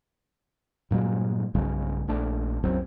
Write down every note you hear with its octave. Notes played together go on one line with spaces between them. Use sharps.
G2 A#2 F#3 G#3
B1 G2 C#3 G#3
A#1 A3 D4
C2 F#2 F#3 C4